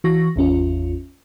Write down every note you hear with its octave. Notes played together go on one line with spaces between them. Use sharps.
E3 F#4 C#6 A#6
G#1 E2 C#4 F4